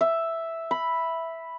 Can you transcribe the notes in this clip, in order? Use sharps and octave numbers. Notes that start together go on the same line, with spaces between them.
E5
B5